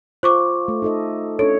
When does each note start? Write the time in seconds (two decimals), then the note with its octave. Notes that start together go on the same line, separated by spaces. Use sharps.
0.23 F4 C5 C#6 D6
0.68 A3
0.82 D#4 A4 D#5
1.39 C#4 D4 A4 C#5